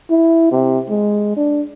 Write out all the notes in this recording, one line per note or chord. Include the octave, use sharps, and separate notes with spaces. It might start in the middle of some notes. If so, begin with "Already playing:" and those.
E4
C3
G#3
D4